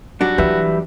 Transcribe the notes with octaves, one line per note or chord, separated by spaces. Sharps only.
F#3 G3 D4 F#4
E3 G4 B4 E5